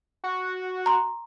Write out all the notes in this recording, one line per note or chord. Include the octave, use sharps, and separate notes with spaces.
F#4
A#5 C6